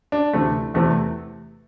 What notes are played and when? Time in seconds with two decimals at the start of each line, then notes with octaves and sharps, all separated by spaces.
0.12 D4
0.33 D2 C3 E3 A3
0.74 E2 C3 E3 A3